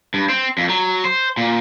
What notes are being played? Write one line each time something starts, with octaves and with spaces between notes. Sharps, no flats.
G2
C4
F2
F#3
C5
A#2